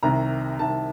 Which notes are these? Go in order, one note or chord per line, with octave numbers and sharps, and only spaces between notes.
C2 C3 D#3 A#5
C2 C3 D#3 A5